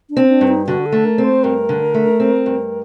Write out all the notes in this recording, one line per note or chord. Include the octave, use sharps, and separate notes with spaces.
D4
C4
D4
G2
D#4
D3 F#4
A4
A3
A#4
C4
C5
G2 A#4
D3
A3
C4
G2